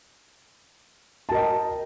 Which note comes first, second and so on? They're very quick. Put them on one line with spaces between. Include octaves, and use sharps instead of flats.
A5 A#4 D#5 G5